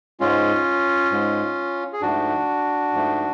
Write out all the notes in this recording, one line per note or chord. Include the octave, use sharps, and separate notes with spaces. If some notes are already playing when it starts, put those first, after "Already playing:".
G#2 G#3 C#4 F4
G#2 G#3
G#4
G#2 F3 A3 D4 F#4
G#2 F3 A3